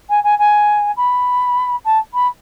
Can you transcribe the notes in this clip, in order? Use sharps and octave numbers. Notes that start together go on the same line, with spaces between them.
G#5
G#5
G#5
B5
A5
B5